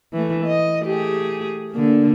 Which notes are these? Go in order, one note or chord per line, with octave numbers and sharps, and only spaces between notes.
E3 A3
D#5
A3 G4 G#4
D3 A#3